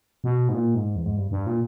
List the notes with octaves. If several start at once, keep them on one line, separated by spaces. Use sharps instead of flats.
B2
G#2
A#2
G#2
E2
G#2
G2
G2
A#2